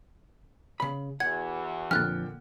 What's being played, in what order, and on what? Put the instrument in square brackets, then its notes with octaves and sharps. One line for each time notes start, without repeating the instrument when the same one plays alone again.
[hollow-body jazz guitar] C#3 B5
[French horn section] E2 E3 F#4 [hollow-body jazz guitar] F#5 [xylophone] G#6
[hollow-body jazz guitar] F2 [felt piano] A#2 D3 G5 [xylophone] F6 F#6 A6